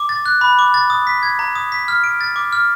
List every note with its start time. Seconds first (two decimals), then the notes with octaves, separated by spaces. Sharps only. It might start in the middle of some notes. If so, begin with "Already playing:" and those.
Already playing: D6
0.09 A6
0.26 F#6
0.41 B5
0.59 D6
0.74 A6
0.90 D#6
1.07 B6
1.23 G#6
1.39 A#5
1.55 D#6
1.72 B6
1.88 F6
2.04 D7
2.21 A6
2.36 D6
2.53 F6